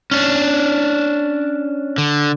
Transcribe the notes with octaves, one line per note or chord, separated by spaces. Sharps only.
C#4 D4
D3